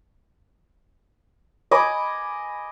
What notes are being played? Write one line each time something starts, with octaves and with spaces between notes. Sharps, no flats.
D#5 G#5 B5 D6